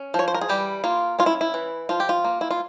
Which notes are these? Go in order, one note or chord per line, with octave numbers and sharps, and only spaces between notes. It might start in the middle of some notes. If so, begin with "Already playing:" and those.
Already playing: C#4
F3 C#5
C5
A#4
G#4
E3 G3 G4
A#3 F4
C#4 F4
E4
E4
E3
F3 F4
G4
F4
A#3
E4
F4